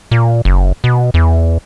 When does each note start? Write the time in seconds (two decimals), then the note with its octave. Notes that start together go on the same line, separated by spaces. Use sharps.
0.11 A#2
0.45 F#1
0.84 B2
1.14 E2